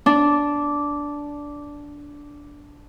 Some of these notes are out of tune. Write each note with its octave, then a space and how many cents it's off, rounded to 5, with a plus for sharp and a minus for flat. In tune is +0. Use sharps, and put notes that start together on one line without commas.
D4 -10